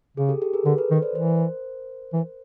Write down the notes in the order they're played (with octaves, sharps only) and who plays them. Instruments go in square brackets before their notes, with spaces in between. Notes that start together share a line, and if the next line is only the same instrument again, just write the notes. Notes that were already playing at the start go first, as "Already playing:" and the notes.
[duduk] C#3 [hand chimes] G#4
[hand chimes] G4 A4
G4 A4
G#4 A#4
[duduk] D3 [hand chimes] A4 B4
[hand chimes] A4 B4
[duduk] D#3
[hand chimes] C5 D5
[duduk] E3 [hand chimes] A#4 C5
[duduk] E3